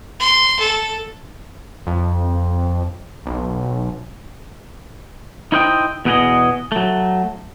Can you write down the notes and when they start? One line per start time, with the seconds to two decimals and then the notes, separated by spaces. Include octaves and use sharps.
0.20 C6
0.59 A4
1.87 F2
3.26 B1
5.52 D#4 E4 C5 D#5 F#5 G5
6.05 E2 B2 B3 G4 G#4 D#5
6.72 F#3 A3